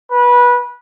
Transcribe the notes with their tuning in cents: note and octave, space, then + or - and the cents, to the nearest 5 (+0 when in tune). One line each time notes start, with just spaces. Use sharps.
B4 -20